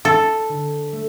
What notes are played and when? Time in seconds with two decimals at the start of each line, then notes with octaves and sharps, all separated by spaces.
0.05 E4 A4
0.49 D3
0.92 A3